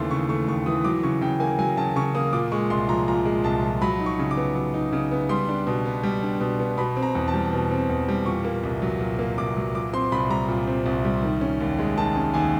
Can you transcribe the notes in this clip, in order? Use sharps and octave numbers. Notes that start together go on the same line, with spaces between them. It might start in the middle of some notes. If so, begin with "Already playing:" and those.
Already playing: D#2 C#3 E3 A3 C6
C#3 C#6
A3 C#6
D#2 C#6
E3 D#6
F#3 D6
C#3 C#6
C#3 G5
A#3 G#5
F#3 G#5
C#3 A5
C#3 C#6
A#3 D#6
A#2 D6
G#3 C#6
C2 C6
F3 A#5
A#2 A#5
G#3
C2 A5
F3
F#3 B5
D#4
C#6
C#3
D6
B3
F#3
D#4
C#3
B3
G3 C6
D4
B2
B3
G3
D4
B2
B3
B2 B5
C4
A#5
E2
A5
G3
B2
C4
E2
G3
A#2 C#6
A#3
C2
F#3
A#2
A#3
C2 D6
F#3
A#2 D6
C4 C6
C2 B5
G3 A#5
A#2
C4
C2
G3
D#3
C#4
D#2
G#3
D#3 A5
C#4
D#2 G#5